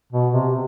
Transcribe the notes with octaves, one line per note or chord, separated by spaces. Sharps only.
B2
C3